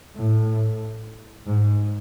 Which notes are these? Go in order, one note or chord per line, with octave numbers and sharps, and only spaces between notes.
A2
G#2